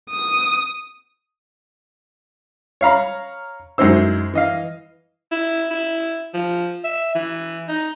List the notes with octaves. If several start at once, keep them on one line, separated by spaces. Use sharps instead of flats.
D#6
C#5 F5 A#5 B5
F#2 G#3 D#4 E4 C5 E6
E3 D#5 F5
E4
E4
F3
E5
E3
D#4